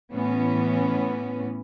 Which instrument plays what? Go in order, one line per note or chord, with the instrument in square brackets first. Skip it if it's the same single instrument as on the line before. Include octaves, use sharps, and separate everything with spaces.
[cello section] A2 E3 B3 C#4